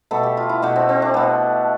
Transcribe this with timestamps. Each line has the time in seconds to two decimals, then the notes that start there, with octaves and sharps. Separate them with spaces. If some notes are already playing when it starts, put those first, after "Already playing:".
0.11 B2 A3 A4
0.23 G4
0.37 F4
0.49 E4
0.62 B2 A3 D4
0.76 C4
0.89 C4
1.02 D4
1.14 B2 A3